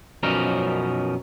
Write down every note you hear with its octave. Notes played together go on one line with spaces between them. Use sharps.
F#2 B2 F3 C#4 D#4 A#4